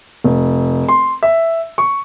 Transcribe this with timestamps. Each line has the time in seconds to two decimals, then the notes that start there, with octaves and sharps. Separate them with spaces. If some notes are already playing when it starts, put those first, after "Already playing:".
0.24 F1
0.89 C6
1.23 E5
1.78 C#6